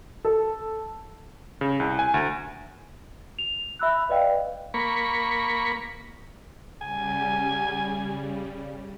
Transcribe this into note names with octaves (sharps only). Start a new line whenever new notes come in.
A4
C#3
C2
G#5
D2
F7
E5 B5 E6 F#6
B4 D5 D#5 F5 G5
A#3 B5 C#6
C#3 G3 G#5